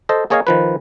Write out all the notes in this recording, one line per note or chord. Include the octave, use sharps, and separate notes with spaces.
A4 C5 D#5
A#3 G#4 C#5 D#5 F5 G#5
D#3 F3 B4